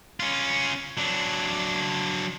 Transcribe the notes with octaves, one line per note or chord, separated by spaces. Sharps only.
C#4 F4
F#3 D4